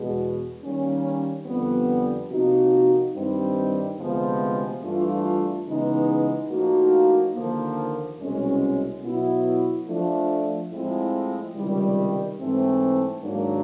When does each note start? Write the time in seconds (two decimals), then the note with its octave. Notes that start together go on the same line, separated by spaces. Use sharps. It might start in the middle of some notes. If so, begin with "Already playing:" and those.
Already playing: E2 B2 G#3
0.62 D#3 G3 A#3 C#4
1.46 F2 D3 G3 B3
2.30 C3 F3 A#3 D#4 F#4
3.14 G2 D#3 G3 C4 D#4
3.98 D2 C3 F3 G#3 B3
4.83 G2 E3 A3 D4 F4
5.66 C#3 E3 G#3 B3 D#4
6.50 A2 F3 A#3 D#4 F#4
7.34 D#2 D3 F3 A#3
8.18 C2 B2 G#3 C#4
9.03 B2 F#3 B3 E4
9.87 F3 A3 D4
10.71 A2 F3 G#3 C4 E4
11.54 C#2 C3 D#3 G3
12.39 G#2 E3 A3 C4
13.23 G#2 D#3 F#3 A#3 D4